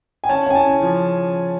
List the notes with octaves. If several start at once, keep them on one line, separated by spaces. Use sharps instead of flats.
G#5
C#4 A5
C#4 G#5
A5
C#3
F3